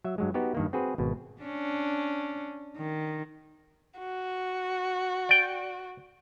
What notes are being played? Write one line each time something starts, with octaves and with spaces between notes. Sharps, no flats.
F#3 E5
G2 F#3 G#3
B3 D#4 F#4 G4
G2 D#3 A#3
C4 F#4 G#4 B4
G#1 B2
C#4 D4
D#3
F#4
D5 G5